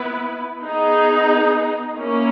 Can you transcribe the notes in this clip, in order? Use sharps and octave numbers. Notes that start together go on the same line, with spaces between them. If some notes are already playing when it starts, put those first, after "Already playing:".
Already playing: B3 E4 B4
B3 D#4 G#4
A#3 C#4 E4